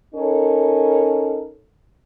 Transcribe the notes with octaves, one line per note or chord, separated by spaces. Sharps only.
C#4 D#4 A4 A#4